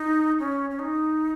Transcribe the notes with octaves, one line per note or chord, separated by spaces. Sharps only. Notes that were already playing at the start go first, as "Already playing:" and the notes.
Already playing: D#4
C#4
C#4
D#4